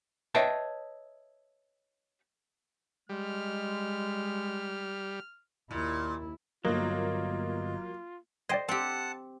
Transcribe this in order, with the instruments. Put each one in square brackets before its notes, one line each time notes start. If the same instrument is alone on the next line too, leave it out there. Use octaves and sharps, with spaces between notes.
[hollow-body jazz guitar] B4 C#5 D#5 E5 G5 A5
[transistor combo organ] G3 [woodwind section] G#3 [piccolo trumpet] F6
[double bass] D#2 E4 [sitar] A#2
[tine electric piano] G1 D#5 [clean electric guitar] F#3 [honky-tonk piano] A#3 [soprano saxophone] F4
[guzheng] C5 D#5 [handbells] D5 G5 G#6
[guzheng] C4 G4 [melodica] F#5 A5